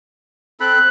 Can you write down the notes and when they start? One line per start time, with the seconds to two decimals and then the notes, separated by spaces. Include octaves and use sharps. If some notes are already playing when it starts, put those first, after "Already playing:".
0.60 C4 A4 B5 F#6